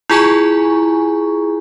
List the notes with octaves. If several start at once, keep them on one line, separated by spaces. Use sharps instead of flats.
E4 F4 G#4 G#5 A#5 C#6